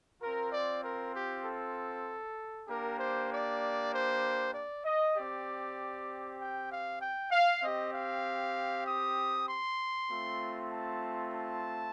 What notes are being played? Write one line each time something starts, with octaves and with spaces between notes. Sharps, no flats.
C4 F4 A#4
D5
A#4
G4
A4
A#3 D4 G4 A#4
C5
D5
C5
D5
D#5
C4 G4 D5
G5
F5
G5
F5
C4 G4 D#5
F5
D#6
C6
A3 C4 F4
A5
A5